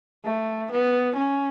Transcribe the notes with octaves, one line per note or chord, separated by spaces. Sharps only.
A3
B3
C#4